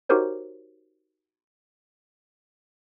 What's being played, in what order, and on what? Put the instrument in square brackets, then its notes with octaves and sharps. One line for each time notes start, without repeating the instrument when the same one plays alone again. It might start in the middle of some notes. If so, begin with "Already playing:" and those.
[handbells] D#4 F#4 G4 A#4 C5 C#5